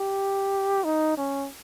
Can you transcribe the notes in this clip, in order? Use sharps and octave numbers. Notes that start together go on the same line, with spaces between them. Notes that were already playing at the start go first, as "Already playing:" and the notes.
Already playing: G4
D#4
C#4